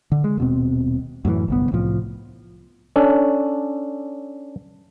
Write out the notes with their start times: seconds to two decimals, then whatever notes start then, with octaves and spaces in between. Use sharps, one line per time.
0.12 D3
0.24 G#3
0.37 D#1 B2 C4
1.25 F#2 A2 C3 E3
1.48 G1 C2 B3
1.72 C2 A2 F3
2.96 C#4 D4 A4